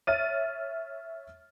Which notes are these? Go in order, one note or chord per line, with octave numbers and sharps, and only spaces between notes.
C#5 E5 F6 A6 D#7